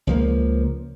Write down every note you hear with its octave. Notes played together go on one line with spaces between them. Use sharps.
C#2 F3 A#3